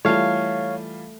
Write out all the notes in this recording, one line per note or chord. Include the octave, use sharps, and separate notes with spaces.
E3 G3 A3 F4 C#5 F5